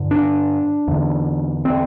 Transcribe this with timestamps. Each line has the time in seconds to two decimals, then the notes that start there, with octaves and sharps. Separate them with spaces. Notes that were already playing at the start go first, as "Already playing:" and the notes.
Already playing: G2 D3
0.11 D4
0.88 E2 D3
1.65 C4